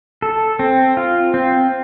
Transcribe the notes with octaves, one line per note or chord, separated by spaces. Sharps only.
A4
C4
F4
C4